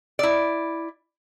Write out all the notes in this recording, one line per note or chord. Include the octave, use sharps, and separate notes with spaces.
E4 D5